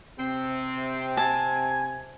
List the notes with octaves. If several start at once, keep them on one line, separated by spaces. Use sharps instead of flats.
C3 C4
G#5 A5